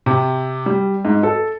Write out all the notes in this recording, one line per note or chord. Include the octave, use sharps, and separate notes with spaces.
C3
G3
G#2
A4